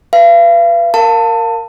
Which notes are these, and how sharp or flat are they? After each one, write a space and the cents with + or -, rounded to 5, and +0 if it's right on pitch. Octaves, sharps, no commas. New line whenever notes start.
B4 -5 F5 -40
A#4 -10 F5 +5 A5 +25